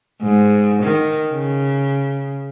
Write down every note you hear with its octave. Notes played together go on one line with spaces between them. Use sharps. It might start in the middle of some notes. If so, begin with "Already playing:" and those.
G#2
D#3
C#3